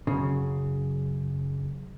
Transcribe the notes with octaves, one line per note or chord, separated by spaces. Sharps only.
F#2 C#3